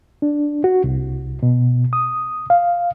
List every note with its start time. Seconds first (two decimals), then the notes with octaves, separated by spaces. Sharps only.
0.22 D4
0.64 F#4
0.84 C2
1.43 B2
1.93 D#6
2.50 F5